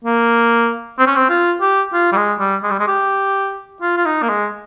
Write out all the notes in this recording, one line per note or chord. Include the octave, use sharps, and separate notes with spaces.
A#3
C4
C#4
C4
F4
G4
F4
G3
G#3
G3
G#3
G3
G#3
G4
F4
F4
D#4
A#3
G#3